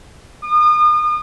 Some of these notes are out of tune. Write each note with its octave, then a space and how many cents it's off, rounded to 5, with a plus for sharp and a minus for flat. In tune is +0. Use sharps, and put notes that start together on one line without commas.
D#6 -35